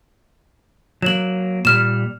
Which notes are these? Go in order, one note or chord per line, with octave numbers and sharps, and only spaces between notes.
F#3 A#3 E7 F#7
A#2 G3 F6 E7